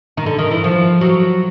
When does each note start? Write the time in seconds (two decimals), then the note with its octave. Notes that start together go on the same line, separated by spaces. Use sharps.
0.17 D#3
0.26 D3
0.38 D#3
0.51 E3
0.64 F3
1.01 F#3